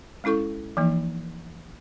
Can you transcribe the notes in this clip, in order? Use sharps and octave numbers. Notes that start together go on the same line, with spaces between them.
G#3 C#4 E4 A4 C#6
E3 F3 A#3 D#4